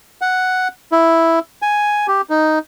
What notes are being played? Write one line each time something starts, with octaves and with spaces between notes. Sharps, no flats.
F#5
E4
G#5
G4
D#4